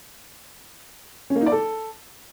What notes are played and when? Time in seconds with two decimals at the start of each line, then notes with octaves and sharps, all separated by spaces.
1.30 C#4
1.36 A#3
1.41 D#4
1.46 D5
1.52 A4